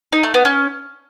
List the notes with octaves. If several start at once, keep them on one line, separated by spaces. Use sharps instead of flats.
D#4
A3
B3
C#4